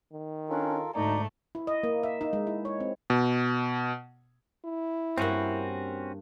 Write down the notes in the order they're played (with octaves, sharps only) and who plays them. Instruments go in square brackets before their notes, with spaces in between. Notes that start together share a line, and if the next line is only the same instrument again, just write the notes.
[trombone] D#3
[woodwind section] C#4 D4 [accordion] F4 A4 A#4
[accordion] D2 D5 A#5 [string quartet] G#2 A3 [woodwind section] D#4
[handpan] E4
D#5
A#3
E5
D#4
G#3
E4
C#5
C4
[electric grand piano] B2
[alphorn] E4
[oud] G2 A#3 [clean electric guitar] C4 C#4 F#4